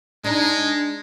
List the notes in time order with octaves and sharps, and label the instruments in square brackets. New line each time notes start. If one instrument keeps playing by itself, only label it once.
[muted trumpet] G#3 [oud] D4 D#4